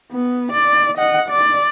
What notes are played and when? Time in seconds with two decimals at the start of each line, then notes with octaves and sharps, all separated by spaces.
0.12 B3
0.53 D5
0.98 D#5 F#5
1.29 D5